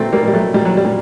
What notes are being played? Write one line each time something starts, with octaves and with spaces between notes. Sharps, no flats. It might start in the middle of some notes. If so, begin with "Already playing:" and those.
Already playing: A#2 A3 C4
G3 A#3
A#2 G3
F#3 A3
A#2 G3
F#3
G3
A#2